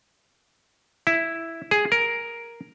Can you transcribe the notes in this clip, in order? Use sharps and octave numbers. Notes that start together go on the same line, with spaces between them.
E4
G#4
A#4